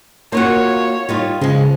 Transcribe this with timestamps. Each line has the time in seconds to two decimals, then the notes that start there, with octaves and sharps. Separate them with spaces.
0.32 A#3 F4 F#4 C#5
1.09 G3 D#4 F4
1.41 C#3 F3 G#3